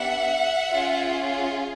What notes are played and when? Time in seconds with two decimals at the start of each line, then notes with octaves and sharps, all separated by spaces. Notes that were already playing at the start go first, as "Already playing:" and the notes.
Already playing: B3 D4 G4 E5 F#5
0.71 C#4 F4 G#4